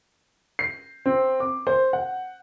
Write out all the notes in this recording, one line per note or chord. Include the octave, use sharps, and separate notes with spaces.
C7
C4
D6
C5
F#5